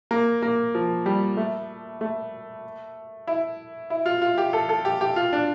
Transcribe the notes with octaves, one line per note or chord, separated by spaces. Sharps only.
A#3
A#3
F3
G3
A3
A3
E4
E4
F4
F4
G4
A4
A4
G4
G4
F4
D4